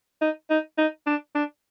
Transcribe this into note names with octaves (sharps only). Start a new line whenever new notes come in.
D#4
D#4
D#4
D4
D4